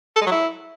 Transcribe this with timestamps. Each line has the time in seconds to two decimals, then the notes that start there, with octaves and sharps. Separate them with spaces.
0.16 A4
0.21 G#3
0.26 F#3
0.31 E4